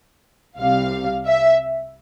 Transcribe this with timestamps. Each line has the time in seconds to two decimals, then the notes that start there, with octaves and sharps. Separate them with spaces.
0.58 C2 C3 G3 F5
1.26 E5